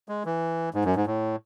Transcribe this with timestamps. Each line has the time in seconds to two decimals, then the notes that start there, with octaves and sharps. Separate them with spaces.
0.09 G#3
0.26 E3
0.74 G#2
0.85 F#2
0.96 G#2
1.07 A2